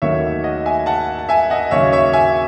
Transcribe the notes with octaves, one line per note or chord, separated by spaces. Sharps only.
D#2 D#3 F#3 A3 D#4 C#5 E5
D#5 F#5
E5 G#5
F#5 A5
A5
E5 G#5
D#5 F#5
D#2 C#3 F#3 C#4 C#5 E5
C#5 E5
E5 G#5